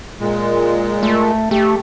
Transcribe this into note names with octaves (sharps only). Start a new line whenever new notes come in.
A#2 G#3
A3
A3 G4